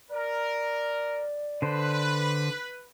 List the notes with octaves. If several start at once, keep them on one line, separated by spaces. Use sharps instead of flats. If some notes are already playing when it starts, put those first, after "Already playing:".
A#4 D5
D3 B4 C5